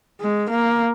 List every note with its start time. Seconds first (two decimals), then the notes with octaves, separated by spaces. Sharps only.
0.21 G#3
0.51 A#3